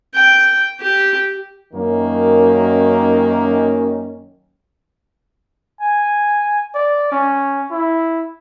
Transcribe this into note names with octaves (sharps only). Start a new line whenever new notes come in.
G5
G4
F#2 D#3 A#3 C#4
G#5
D5
C#4
E4